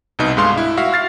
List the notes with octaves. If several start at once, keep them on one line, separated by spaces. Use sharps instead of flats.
C2 B2 D#4 B4
G2 G#3 A3 F5 C6
E4
F#4 E5 F5
F6 A6 C7